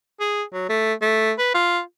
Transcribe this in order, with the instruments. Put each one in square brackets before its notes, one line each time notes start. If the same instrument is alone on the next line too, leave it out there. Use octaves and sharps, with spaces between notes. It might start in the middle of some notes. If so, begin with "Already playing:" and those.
[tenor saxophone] G#4
F#3
A3
A3
B4
F4